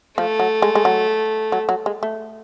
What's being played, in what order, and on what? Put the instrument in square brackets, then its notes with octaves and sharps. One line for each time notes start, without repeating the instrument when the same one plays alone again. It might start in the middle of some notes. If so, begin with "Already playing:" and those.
[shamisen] F3 [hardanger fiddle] A3
[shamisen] F#3
G#3
G#3
F#3
F#3
F#3
G#3
A3